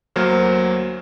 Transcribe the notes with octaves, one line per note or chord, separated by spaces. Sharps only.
D2 F#3 A#3 C5 F6